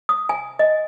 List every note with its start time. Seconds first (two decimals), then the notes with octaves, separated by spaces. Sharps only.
0.09 D#6
0.29 G#5
0.59 D#5